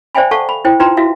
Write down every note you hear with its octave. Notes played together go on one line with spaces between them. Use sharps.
C5 D5 E5 G5 G#5 B5
A4 F5 F#5 A5 C#6
B5
E4 C5 G5
D#4 F4 B4 G5 A#5 C6
E4 F#4 E5 F5